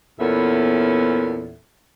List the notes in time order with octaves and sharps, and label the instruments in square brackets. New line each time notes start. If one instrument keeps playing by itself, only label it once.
[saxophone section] E2 A#2 B3 C#4 A4 E5